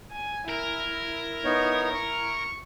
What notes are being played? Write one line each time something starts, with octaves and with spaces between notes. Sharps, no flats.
G#5
E4 A#4
B3 D#4 C#5
C#6